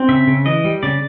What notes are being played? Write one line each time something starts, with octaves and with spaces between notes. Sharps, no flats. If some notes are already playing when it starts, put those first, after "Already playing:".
Already playing: C4
C#3 E5
C#3
E3 D#5
G3
C#3 D5